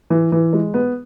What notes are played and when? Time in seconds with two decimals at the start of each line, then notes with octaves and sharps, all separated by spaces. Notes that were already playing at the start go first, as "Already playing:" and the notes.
0.10 E3
0.32 E3
0.53 G#3
0.74 B3